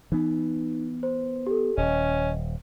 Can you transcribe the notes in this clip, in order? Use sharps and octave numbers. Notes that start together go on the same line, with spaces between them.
E3 B3 D#4
C5
G4 A4
D#1 C#4 D#5